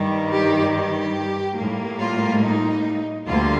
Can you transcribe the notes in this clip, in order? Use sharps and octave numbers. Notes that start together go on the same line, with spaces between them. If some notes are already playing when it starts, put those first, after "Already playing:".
Already playing: G2 D#3 G3
G4
G4
A2 G3 A#3
F4
D#4
D2 D3 G3 A#3 F4